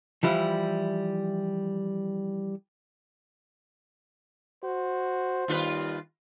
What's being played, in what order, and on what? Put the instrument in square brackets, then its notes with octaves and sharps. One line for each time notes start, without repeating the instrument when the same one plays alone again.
[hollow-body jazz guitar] E3 F3 G3 E4
[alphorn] F#4 [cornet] C5
[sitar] D#2 F4 B4 [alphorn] G3